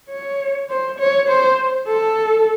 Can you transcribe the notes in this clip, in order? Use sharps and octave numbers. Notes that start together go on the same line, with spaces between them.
C#5
C5
C#5
C5
A4